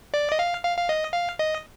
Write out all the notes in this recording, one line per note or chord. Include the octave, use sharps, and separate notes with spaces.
D5
D#5
F5
F5
F5
D#5
F5
D#5